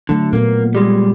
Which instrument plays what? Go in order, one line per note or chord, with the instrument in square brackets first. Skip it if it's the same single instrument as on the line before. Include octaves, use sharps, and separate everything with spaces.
[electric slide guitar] D3 [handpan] F#3 A3
[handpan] A#2 B3 [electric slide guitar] A#3
[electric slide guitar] G3 G#3